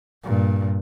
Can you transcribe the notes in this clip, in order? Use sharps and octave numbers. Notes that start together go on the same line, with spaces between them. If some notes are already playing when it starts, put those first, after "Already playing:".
G2 A#2